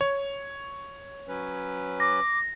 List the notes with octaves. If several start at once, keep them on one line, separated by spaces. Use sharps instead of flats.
C#5
F#3 C#4 B4
D6 A#6